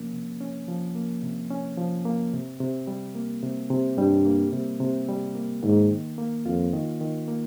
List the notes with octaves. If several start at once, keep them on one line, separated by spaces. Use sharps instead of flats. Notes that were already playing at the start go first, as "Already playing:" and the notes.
Already playing: C3 F3 A#3 C#4
C3
C#4
F3
A#3
C3
C#4
F3
A#3
C3
C3
G3
A#3
C3
C3
G2 G3
A#3
C3
C3
G3
A#3
G#2 D#3
D#3
A#3
F2 F4
D#3
D#3
A#3